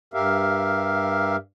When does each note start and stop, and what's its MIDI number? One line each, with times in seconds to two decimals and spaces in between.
0.14 1.36 43
0.14 1.36 67
0.14 1.36 70
0.14 1.36 76
0.14 1.36 77